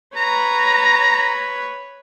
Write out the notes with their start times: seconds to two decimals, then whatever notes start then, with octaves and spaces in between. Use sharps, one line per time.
0.16 B4 C#5 A#5